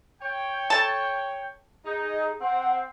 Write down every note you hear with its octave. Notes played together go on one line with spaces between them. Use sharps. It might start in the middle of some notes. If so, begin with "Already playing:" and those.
C#5 G5
A4 A5
D#4 G#4
C4 F#5